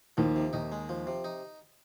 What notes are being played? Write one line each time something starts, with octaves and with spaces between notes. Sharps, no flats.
D#2 D#3 F3
C3
D#2 D#3 D#4
G#3
F3
C3
D#4